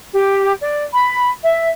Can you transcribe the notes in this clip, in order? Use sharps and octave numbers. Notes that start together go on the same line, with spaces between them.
G4
D5
B5
E5